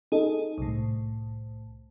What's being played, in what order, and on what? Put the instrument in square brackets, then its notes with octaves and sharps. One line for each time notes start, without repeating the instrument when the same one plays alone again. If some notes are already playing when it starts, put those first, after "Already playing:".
[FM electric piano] D#4 G#4 A4 D#5
C2 A2